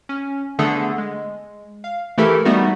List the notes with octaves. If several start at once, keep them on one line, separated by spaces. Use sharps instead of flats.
C#4
D3 A3 B3 D4 G#4 A4
G#3
F5
E3 A3 E4 G4 A4 A#4
G3 A3 B3 D#4 F#4